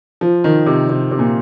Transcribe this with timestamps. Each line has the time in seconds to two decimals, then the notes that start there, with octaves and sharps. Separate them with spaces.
0.21 F3
0.44 D#3
0.66 C3
0.89 C3
1.11 C3
1.19 A#2